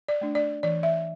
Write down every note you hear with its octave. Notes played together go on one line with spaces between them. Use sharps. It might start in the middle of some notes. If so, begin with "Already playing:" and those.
D5
A3 D4
D5
E3 D5
E5